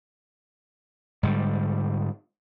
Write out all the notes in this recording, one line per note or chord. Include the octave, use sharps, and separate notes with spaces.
G#2 D3 G3